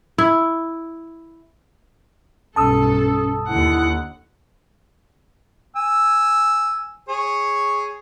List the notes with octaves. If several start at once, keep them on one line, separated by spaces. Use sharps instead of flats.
E4
B1 G2 C#4 A4 A5 D#6 E6
D#2 D3 E4 F#5
G#5 E6
G#4 C#5